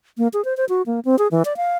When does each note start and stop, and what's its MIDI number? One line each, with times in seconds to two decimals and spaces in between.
0.18 0.28 58
0.33 0.44 68
0.45 0.56 72
0.57 0.65 72
0.69 0.82 66
0.86 1.00 58
1.05 1.18 60
1.19 1.28 68
1.31 1.43 52
1.45 1.56 74
1.57 1.77 77